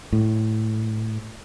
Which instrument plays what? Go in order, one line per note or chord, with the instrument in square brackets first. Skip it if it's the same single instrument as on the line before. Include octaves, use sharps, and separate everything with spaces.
[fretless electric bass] A2